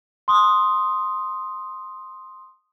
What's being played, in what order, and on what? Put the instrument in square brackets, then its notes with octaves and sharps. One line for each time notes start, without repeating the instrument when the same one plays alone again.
[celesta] C6 D#6